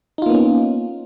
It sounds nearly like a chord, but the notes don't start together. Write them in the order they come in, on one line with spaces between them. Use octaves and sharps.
D#4 F4 A#3 B3 C#4